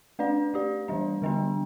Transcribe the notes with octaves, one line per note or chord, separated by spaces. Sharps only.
A3 D4 B4 D5
A3 G4 D5
E3 G3 D4
D3 G3 B3 D4